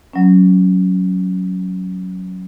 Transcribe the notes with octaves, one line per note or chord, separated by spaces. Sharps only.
F#3 C#4